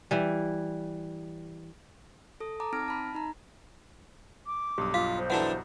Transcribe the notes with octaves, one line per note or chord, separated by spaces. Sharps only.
E3 G3
A4 D#6
A5 A#5 D6
C4 D#4 F6 A#6 D7
A5 B5
D#4 A#5
D6
B1 G2 G4 D#6
F4 F5
C5
E3 D4 E4 F#4 A4 F#5